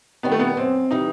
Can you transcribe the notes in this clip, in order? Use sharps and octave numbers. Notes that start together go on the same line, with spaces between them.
D#3 G3 B3
A3
B3
F#2 C4
E3 G3 D#4